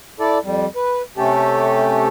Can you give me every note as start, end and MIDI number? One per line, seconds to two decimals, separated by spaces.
0.20 0.38 64
0.20 0.38 69
0.20 0.38 74
0.44 0.66 41
0.44 0.66 55
0.76 1.02 71
1.17 2.08 48
1.17 2.08 57
1.17 2.08 61
1.17 2.08 67
1.17 2.08 69